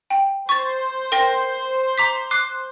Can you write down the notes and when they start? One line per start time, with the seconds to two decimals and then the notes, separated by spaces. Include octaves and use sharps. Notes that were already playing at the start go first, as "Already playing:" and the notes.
0.10 G5
0.49 C5 C#6 A6
1.12 A#4 G5 A#6
1.98 A#5 D6 B6
2.31 D6 F#6 C7